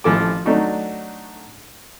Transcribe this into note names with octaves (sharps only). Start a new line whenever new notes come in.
A1 F3 E4 A4 G#5 D6
F#3 A3 D4 D#4 F#4